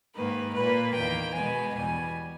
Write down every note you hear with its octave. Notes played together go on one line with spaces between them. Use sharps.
G#2 D#3 A#3 B4
A#2 A#3 B4
E2 D#3 A#3 G5
B2 G#3 B3 G#5
E2 B2 G3 G#5